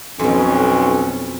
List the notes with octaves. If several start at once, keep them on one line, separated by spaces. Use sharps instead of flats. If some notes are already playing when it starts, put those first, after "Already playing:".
B1 F2 B2 C#4